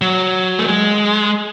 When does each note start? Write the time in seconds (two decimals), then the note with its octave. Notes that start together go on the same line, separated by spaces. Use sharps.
0.02 F#3
0.59 A3
0.66 G#3